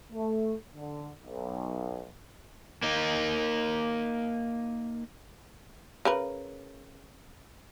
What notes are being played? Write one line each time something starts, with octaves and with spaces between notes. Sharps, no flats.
A3
D3
B1
A#3 D#4
C#3 A#4 B4